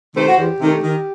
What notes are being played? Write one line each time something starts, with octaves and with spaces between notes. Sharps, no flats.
C3 D#3 A3 C5
F#4
E2 G4
C3 D#3 A3
D#3